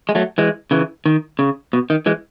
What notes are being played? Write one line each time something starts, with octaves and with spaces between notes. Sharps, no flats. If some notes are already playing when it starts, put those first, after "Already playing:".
G#3
F#3 A3
E3 G#3
C#3 E3
D#3
C#3
B2
D#3
E3 G#3